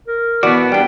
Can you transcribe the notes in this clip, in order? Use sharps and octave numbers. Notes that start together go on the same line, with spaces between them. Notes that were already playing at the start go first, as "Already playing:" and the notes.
A#4
B2 E3 B3 F#4 D5
G3 D4 G5